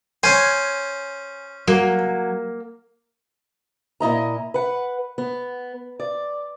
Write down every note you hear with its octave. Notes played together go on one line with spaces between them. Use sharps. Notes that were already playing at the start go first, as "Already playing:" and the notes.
C#4 C5 G#5
F#3 A#3
A#2 E4 D#5 A#5
B4 F#5
B3
D5